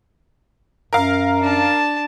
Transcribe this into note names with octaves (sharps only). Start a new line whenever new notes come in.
F#2 A#4 F5
D4 A5